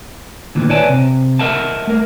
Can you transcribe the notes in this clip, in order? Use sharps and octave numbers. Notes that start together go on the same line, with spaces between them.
D2 A#2 D#3 E3
B4 C#5 D5 E5 G#5 A5
C3
A#4 D#5 E5 F#5 A5
A3 A#4